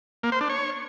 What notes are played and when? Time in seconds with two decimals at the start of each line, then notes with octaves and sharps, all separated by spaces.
0.23 A#3
0.32 C5
0.41 D4
0.50 C#5